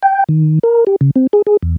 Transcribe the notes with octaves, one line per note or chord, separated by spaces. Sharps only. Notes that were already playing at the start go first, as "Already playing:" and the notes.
G5
D#3
A#4
G4
C#3
C4
G#4
G#4
E2